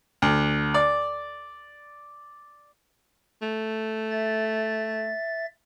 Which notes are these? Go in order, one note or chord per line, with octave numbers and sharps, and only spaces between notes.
D2
D5
A3
E5 A6